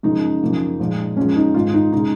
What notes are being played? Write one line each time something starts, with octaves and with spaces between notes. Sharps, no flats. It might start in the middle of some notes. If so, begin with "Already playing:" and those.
F#2 C#3 F3 G#3 D#4
F#2 C#3 F3 A#3
A#2 F3 G#3
F#2 F3 G#3 C#4
D#4
G#2 D#3 G#3 F4
D#4
C#3 G#3 D#4